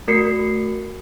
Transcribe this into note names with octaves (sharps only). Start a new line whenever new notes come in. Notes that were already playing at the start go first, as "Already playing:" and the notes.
A3 F#4 A#4 C7 C#7